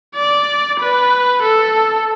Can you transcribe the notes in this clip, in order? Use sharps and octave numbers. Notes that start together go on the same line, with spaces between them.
D5
B4
A4